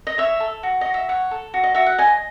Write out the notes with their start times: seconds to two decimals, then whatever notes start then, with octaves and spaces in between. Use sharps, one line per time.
0.07 D#5
0.18 C#5 E5
0.40 A4
0.63 F#4
0.81 F#4 D#5
0.94 E5
1.09 C#5 F#5
1.31 A4
1.54 F#4
1.63 D#5
1.74 F#4 E5
1.86 F#5
1.98 D#5 G#5